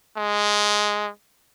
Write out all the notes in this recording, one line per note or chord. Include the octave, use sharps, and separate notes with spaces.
G#3